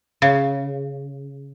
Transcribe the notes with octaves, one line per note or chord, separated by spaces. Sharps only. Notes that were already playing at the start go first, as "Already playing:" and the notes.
C#3